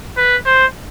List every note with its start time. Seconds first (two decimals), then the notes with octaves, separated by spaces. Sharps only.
0.17 B4
0.46 C5